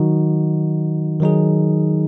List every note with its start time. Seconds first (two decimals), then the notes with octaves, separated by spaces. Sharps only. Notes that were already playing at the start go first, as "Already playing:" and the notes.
Already playing: D#3 F#3 D#4 F#4
1.20 D#3 F#3 D#4 G#4